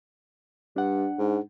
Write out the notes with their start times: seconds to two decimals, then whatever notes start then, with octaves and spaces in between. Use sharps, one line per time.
0.76 G2 D4 F#5
1.19 G#2